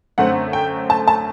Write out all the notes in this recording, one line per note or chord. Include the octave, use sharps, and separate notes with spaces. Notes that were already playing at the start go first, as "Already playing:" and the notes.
F#2 D3 A3 C4 F#5
G5
A5
A5